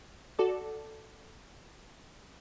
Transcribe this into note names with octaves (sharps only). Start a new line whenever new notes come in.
F#4 A4 D5